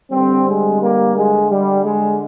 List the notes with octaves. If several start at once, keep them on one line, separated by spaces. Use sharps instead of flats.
D3 G3 C4
G#3
A#3
G#3
G3
G#3